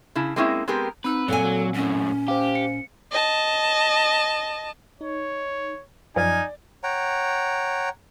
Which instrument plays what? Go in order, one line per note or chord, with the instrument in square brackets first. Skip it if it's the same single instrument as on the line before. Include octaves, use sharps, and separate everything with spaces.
[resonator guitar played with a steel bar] C#3 E4 A5
G#3 A#3 C4 C#4 D#4 E4
G#3 B3 C4 G4 A#4
[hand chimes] C4 E6 [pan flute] D#4 [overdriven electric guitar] B4
[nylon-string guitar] A#2 G#5 [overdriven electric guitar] F#3 [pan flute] A4
[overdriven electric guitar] F#3
[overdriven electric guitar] F#2 A2 [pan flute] C#4
[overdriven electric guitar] G4 [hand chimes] C5 F5
[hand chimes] C#7
[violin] D#5 A5
[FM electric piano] D#4 [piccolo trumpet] C#5
[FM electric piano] F#2 F3 F6 [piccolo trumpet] D#4 [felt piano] D5 [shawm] G#5
[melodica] C#5 F#5 G5 A#5